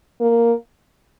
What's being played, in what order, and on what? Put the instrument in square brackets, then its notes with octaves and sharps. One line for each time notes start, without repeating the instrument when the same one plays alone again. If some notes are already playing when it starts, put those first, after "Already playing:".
[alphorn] A#3